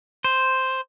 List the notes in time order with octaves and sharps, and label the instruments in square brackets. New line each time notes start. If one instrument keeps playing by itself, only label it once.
[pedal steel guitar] C5